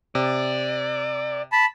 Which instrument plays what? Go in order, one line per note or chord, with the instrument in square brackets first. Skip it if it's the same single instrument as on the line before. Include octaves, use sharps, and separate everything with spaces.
[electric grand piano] C3 [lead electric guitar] D5
[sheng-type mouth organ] A5 B5